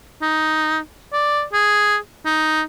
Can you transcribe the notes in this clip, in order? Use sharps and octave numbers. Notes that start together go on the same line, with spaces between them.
D#4
D5
G#4
D#4